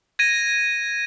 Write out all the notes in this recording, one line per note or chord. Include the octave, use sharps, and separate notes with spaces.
G#6 A#6 D#7